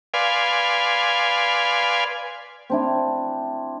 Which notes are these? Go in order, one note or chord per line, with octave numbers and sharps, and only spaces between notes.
B4 D5 F5 G#5 C6
C4 D4 E4